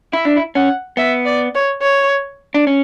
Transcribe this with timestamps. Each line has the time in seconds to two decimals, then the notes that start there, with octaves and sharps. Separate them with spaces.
0.13 E4 E5
0.25 D4
0.36 E4
0.55 C#4 F#5
0.97 B3 E5
1.26 D5
1.55 C#5
1.82 C#5
2.54 D4
2.67 C#4